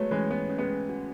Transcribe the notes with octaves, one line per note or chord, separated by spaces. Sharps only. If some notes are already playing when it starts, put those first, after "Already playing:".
Already playing: F#3 G#3 A3 B3 C#5
E3 G#3 C#4
B3
C#4
G#3 B3
F#4